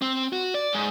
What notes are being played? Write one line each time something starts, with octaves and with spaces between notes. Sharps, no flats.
C4
F#4
D5
G#2